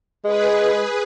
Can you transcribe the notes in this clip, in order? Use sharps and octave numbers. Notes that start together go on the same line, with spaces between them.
G#3 G#4 B4